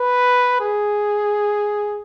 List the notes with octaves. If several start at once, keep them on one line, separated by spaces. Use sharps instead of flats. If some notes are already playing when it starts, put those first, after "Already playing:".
Already playing: B4
G#4